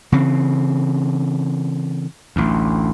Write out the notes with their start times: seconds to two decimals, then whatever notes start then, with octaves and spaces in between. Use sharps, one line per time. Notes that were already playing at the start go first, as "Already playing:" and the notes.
0.12 C#3 E3 C4
2.36 A1 D2